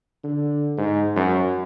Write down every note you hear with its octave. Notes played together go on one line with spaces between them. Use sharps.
D3
G#2
F#2